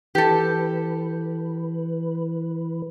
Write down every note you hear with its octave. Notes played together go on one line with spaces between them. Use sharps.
E3 G4 A4 B4